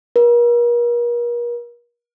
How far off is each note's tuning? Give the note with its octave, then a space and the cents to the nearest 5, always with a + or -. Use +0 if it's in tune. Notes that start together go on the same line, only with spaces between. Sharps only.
A#4 +40